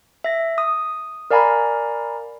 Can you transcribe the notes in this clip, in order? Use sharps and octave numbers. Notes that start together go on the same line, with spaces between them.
E5 A#6
D#6
A#4 D5 F5 G#5 A#5 B5